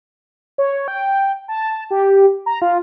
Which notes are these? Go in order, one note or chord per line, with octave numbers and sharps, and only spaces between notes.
C#5
G5
A5
G4
A#5
F4